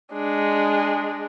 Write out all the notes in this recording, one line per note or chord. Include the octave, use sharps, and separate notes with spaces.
G#3 D4